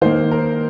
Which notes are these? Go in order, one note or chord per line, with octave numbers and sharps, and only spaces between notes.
D#3 A#3 C5
A#4